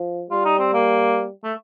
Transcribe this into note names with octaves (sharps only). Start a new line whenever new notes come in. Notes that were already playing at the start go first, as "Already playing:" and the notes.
Already playing: F3
G3 F4
D#4
C4
A#3
A3